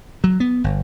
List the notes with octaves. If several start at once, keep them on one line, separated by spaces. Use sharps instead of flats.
F#3
B3
G1